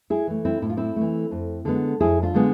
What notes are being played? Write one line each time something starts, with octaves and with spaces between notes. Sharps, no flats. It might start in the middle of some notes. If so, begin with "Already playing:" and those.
E4 G#4
E3 A3
C4 E4
A2 E4
F4
C4 E4
E3 A3
F2
D3 G#3 B3
F2 E4 G#4
D4 F4
D3 G#3 B3